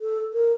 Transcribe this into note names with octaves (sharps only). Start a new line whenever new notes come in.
A4
A#4